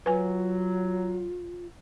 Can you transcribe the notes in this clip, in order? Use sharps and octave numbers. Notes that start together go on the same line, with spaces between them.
F#3 F4 B4 G#5